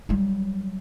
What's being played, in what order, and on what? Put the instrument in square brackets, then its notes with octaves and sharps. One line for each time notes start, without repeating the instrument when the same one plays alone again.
[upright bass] F#3 G3